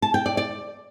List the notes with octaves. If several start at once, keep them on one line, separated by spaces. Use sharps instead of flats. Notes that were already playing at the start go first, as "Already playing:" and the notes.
A5
G5
D5
D5